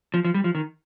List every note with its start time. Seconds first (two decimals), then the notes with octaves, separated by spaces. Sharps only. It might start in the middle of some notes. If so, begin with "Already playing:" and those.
0.14 F3
0.25 F3
0.34 G3
0.44 F3
0.55 D#3